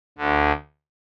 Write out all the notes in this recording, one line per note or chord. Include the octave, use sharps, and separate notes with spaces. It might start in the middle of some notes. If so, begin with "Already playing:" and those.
D2 D3